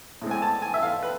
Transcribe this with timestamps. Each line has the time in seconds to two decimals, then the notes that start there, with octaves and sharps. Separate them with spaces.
0.22 A2 G#3 C4
0.31 G#5
0.42 A5
0.62 G#5
0.74 E5
0.83 F5
1.03 B4